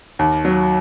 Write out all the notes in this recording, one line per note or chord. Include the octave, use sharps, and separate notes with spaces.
D#2
F#3